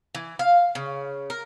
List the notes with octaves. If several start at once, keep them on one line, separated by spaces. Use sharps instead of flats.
E3
F5
C#3
A#4